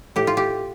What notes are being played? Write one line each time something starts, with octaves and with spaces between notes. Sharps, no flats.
A2 G4
F4
G4